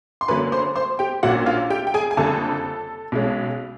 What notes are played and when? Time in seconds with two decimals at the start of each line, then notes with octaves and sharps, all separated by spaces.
0.21 C6
0.28 F#2 D3 F#3 A#3 B4 B5
0.52 C5 C6
0.76 C5 C6
0.99 G4 G5
1.23 A#1 A#2 F#3 A#3 C#4 F#4 F#5
1.46 F4 F5
1.70 G4 G5
1.87 G5
1.94 G#4 G#5
2.11 G#5
2.17 F#1 F2 D3 G3 A4 A5
3.12 B1 B2 G#3 C#4